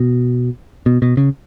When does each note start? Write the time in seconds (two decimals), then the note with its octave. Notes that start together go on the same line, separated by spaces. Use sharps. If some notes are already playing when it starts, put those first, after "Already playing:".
Already playing: B2
0.86 B2
1.02 B2
1.17 C#3